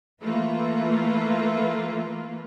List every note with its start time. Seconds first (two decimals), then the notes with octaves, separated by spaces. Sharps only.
0.22 E3 A3 A#3 F4 B4